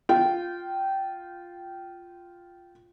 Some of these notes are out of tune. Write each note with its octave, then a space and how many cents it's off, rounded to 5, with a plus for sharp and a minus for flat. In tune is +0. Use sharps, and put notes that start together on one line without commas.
F4 +0 G5 -15